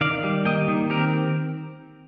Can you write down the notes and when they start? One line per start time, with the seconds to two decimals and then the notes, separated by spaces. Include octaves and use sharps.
0.01 D#3 D5 F5
0.24 G3
0.45 A#3 D#5 G5
0.68 D#3
0.90 C4 G4 A#4